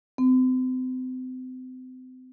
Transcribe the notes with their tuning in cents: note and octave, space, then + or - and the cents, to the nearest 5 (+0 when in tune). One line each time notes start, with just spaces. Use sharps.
C4 -40